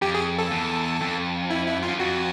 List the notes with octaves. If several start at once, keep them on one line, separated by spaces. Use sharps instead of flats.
F2 G4
G#4
A4
E2
F2
E4
E4
F4
F#2
F2 F#4